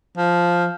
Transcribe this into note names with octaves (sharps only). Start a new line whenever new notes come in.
F3